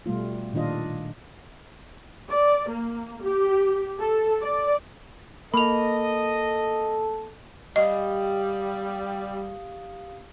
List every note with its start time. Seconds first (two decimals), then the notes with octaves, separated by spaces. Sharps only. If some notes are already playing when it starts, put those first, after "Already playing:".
0.06 B2 G3 A3 F4
0.53 A#2 D#3 D4 F4 D#5
2.29 D5
2.69 A#3
3.23 G4
4.00 A4
4.42 D5
5.54 A#3 A4 D#5 B5 F7
7.76 G3 G4 D#5 F5 D#6